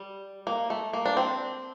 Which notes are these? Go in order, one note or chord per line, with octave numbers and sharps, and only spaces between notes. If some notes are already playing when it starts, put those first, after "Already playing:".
Already playing: G3
A#3
A3
A#3
D4
C4